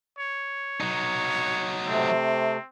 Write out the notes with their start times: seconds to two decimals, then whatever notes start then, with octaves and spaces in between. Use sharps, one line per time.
0.19 C#5
0.81 F#3 D#4
1.86 C3 A3 C4